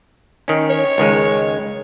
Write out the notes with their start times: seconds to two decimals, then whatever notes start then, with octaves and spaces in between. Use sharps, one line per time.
0.48 D#3 C#4
0.70 C#5
0.98 C#2 D#3 G#3